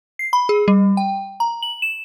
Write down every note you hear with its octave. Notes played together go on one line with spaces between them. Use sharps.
C7
B5
G#4
G3
G5
A#5
F#7
E7